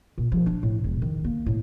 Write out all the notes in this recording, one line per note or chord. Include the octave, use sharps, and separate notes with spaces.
A#2
F3
D4
A2
E1
D#3
A#3
A2